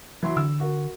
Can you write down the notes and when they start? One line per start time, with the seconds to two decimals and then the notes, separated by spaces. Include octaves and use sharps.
0.23 E3 F#3 C6
0.37 D3 E6
0.60 F#4 A#4